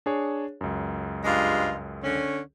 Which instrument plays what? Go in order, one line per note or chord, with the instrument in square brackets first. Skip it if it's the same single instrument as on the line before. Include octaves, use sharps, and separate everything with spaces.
[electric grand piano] D4 G#4 C#5
C#2 F#2
[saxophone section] G2 G#3 F4
D3 C#4